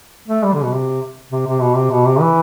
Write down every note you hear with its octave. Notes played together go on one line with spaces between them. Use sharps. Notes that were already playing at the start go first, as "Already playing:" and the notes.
A3
G3
D3
B2
C3
C3
C3
B2
C3
B2
C3
E3